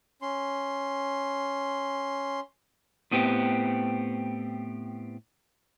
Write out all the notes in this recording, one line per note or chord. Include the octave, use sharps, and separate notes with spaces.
C#4 C6
A2 B3 C4 G4